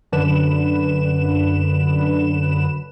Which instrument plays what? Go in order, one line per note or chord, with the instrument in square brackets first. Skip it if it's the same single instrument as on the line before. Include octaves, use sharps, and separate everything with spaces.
[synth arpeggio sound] F#2 D3 B4 E7